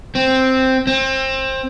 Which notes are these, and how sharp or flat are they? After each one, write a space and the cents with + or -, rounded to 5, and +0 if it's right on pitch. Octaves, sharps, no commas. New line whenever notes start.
C4 +0
C4 +25